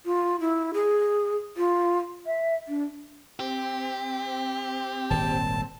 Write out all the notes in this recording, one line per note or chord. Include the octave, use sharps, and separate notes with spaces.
F4
E4
G#4
F4
E5
D4
C4 G4
D#1 G#1 A5